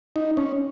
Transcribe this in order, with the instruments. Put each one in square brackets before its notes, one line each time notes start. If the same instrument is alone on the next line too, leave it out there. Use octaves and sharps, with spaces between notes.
[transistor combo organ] D#4
C#4